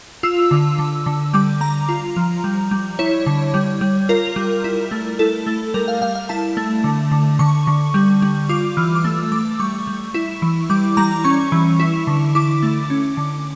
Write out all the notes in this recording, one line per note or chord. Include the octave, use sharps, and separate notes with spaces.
F4 E6
D3
D3
D3
G3 D6
G3 A#5
F4
F3
G3
G3
E4 C#5
D3
G3
G3
F4 A#4
G3
E4
A3
E4 A4
A3
G3 A#4
F5
G3 F5
F5
E4 A5
A3
D3
D3
D3 C#6
D3
G3
G3
F4 D6
E3 F6
D6
A3 E6
A3 D6
G3 C#6
G3
E4
E3
G3 D6
G3 A#5
C#4 C#6
E3
E4
D3
E4 D6
A3
C#4
D3